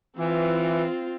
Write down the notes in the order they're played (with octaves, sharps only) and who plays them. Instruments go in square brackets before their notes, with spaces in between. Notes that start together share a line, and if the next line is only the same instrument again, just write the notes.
[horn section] E3 [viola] C4 F4